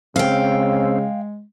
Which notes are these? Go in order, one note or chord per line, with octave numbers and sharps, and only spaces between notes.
C#3 G#3 C4 F5 G5